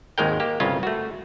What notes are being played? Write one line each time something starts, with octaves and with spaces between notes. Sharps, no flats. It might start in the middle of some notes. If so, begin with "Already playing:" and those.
G#1 D#2 G#3 A#4 G5
A#3 G4
G1 C2 C#3 C#4 F4
A3 F#4